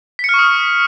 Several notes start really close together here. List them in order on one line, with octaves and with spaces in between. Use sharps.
B6 C#7 F6 C#6 D#6